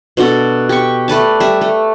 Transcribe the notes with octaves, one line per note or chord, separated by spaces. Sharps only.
B2 D4 F#4 A4
G4 C#6
A3 B4 D5 A5
G3 E5
A3